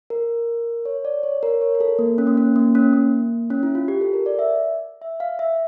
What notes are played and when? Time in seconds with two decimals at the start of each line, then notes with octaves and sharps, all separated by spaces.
0.10 A#4
0.85 C#5
1.05 D5
1.23 C#5
1.43 A#4
1.61 C#5
1.75 A#4
1.80 A4
1.99 A#3
2.18 C#4
2.27 A#3
2.37 C#4
2.56 A#3
2.75 C#4
2.93 A#3
3.50 C#4
3.63 E4
3.75 F4
3.88 G4
4.01 A4
4.13 A#4
4.26 D5
4.39 E5
5.02 E5
5.20 F5
5.39 E5